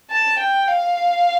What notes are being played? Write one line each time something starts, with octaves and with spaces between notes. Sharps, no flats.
A5
G5
F5